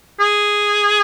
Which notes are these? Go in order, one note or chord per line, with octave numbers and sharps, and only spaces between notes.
G#4